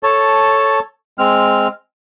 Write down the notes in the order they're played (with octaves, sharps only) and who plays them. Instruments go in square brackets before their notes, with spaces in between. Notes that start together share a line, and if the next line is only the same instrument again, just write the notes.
[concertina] A4 C#5 A5
G#3 C4 F6